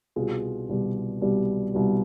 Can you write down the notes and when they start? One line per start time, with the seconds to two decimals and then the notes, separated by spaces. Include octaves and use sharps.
0.16 C2 B2 G3 F4 G#4
0.69 C2 B2 G3
1.21 C2 B2 G3
1.74 C2 B2 G3